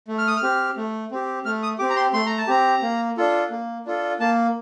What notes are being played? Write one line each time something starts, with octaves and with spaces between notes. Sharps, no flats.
A3
F6
D#6
F6
C4 G4
A3
C4 G4
A3 F6
D#6
C4 G4 D6
A#5
C6
A3 C6
A#5
A5
C4 G4 A#5
A#3
D4 F4 A4
A#3
D4 F4 A4
A#3 A5